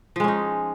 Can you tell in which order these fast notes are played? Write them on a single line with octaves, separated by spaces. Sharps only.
F3 G#3 C#4 D#4